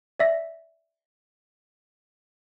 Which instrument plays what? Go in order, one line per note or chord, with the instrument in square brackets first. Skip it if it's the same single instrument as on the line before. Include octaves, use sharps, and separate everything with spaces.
[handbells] D5 E5 A#6